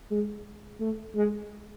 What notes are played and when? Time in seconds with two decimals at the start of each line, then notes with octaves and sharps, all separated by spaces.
0.11 G#3
0.80 A3
1.15 G#3